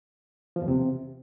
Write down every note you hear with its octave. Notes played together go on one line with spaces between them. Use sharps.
F3
E2
C3